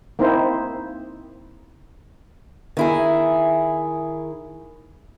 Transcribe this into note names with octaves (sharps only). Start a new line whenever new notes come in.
A#3 C4 D#4 E4 C5
D#3 E4 G#4